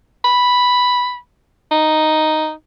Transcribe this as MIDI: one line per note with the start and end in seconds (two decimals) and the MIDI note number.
0.25 1.17 83
1.71 2.51 63